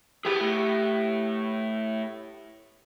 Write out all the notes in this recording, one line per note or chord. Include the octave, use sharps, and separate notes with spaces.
B3 E4 G4 G#4 G5
A2